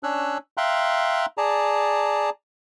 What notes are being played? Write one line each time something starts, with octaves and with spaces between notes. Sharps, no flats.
C#4 D4 C#5 E6 F#6
E5 F5 G5 A#5 C6 F#6
G#4 D5 A5 A#5